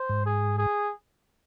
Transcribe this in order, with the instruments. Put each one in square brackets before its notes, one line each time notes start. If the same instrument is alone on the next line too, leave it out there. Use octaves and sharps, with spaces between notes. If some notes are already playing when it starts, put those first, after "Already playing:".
Already playing: [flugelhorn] C5
[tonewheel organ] G#2
[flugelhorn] G#4
G#4